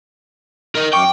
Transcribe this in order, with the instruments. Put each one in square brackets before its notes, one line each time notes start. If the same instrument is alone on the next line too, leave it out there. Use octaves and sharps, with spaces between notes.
[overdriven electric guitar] A#4 D#5
[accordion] F#2 C#6 D6 [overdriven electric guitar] G5